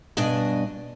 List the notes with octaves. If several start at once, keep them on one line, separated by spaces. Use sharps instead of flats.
G2 B2 D4 D5 D#5 G#5